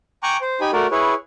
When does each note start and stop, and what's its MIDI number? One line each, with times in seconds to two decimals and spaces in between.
0.23 0.37 79
0.23 0.37 80
0.23 0.37 82
0.23 0.37 85
0.23 0.37 86
0.23 0.37 90
0.41 0.60 72
0.61 0.71 63
0.61 0.71 67
0.61 0.71 80
0.61 0.71 83
0.73 0.87 57
0.73 0.87 66
0.73 0.87 70
0.73 0.87 74
0.91 1.14 64
0.91 1.14 68
0.91 1.14 71
0.91 1.14 73